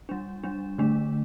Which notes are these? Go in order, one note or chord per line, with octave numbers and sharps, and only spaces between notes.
G3 D4
G3 D4
D3 A3 D4